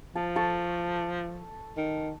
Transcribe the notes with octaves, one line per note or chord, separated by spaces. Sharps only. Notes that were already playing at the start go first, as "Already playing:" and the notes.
F3 A5
A4 A5 C#6
D#3